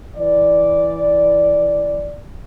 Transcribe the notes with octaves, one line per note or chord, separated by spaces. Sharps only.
E3 D5